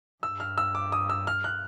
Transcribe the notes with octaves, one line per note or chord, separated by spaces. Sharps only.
G2 E6
F6
E6
D6
D#6
E6
F6
F#6